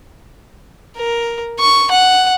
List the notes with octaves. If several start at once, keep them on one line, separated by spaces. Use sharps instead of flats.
A#4
C#6
F#5